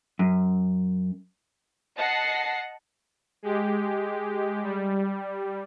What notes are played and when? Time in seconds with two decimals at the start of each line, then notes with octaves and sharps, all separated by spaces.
0.19 F#2
1.97 D#5 F#5 A5 A#6 C7
3.43 G#3 G4
4.63 G3